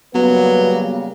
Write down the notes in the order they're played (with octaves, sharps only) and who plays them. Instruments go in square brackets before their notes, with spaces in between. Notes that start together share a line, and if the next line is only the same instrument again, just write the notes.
[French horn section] C#3 G3 A#3 [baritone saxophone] F#3 [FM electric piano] B3 [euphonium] B4